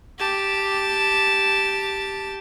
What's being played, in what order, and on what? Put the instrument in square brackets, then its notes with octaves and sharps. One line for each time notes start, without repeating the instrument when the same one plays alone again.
[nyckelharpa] G4 A5